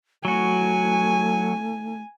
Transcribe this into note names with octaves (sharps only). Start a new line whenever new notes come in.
F#3 A3 F#4 G#5